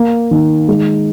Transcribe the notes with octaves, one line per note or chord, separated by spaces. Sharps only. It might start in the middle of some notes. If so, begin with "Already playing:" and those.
Already playing: A#3
D#3
G#3